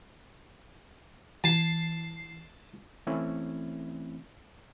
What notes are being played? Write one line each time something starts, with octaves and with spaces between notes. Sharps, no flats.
E3 A5 C7
E3 A3 C4 C#4 E4